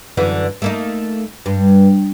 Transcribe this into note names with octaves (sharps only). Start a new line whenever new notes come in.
F#2 D3 E3
A3 A#3 D#4
G2